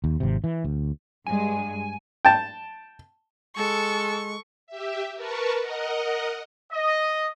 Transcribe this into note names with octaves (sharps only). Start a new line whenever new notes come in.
D#2
G#1 C3
E3
D2
G2 G#3 G#5
G5 A5
G#3 A4 C#6
G4 E5
A#4 B4 A5 C#6
A#4 D#5 F#5
D#5